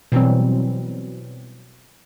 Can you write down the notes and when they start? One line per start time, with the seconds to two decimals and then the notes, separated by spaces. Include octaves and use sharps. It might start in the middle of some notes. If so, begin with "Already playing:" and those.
0.12 B2 E3 F#3 G3 C4